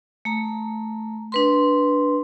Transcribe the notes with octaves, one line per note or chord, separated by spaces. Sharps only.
A3 A#5
D4 B4 C6